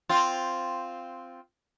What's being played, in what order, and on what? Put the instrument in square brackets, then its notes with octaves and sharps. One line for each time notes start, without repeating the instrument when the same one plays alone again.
[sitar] C4 F4